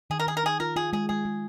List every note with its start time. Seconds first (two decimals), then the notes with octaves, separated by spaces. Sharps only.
0.10 D#3 G#4
0.20 A#4
0.27 D#3 G#4
0.37 A#4
0.43 D#4 G#4
0.60 F4 A#4
0.76 F4 G#4
0.93 G#3 G#4
1.09 G#3 G#4
1.25 G#3